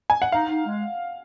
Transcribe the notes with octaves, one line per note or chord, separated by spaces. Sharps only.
G#5
F#5
D#4 F5
D#4
G#3